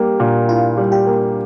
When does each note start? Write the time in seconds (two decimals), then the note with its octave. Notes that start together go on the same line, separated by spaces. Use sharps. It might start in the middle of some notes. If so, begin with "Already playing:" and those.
Already playing: G3 A#3 G4
0.20 A#2
0.48 E4 F4
0.77 G3
0.92 G4
1.07 A#3